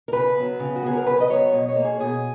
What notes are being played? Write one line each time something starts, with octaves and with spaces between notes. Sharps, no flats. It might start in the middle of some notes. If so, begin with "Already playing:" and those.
A#4
C#3 B4
F#3 B3
C#3
F#4
F#3 B3 G#4
A#4
C#3 B4
D#5
F#3 B3 C#5
B2 D#5
C#5
A#3
G#4
B2 G#4